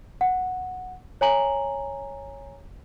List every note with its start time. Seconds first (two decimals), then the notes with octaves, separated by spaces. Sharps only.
0.21 F#5
1.21 C#5 G#5 A#5 F#7